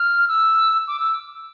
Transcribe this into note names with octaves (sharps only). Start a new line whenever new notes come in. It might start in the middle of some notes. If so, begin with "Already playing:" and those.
Already playing: F6
E6
D6
E6